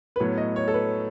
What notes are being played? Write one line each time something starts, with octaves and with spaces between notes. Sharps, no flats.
B4
A2 F#3 B3 C#5
D#5
C#5
A4
B4